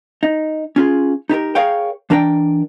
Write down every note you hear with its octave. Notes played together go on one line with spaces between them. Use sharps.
D#4
C#4 F4 G#4
D#4 G4 A4 A#4
G#4 A#4 C#5 F5 G5
E3 D4 A#4 D5 G5